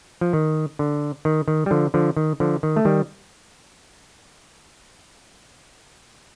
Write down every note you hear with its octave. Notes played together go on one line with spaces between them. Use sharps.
F3
D#3
D3
D#3
D#3
G3
D3 F3
D3 F3
D#3
D3 F3
D#3
A3
D#3 G3